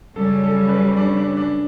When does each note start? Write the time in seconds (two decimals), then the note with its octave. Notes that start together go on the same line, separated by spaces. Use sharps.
0.16 F#2 C#3 G3 C#4 A4
0.43 A4
0.69 B4
0.97 D4
1.17 D4
1.37 D4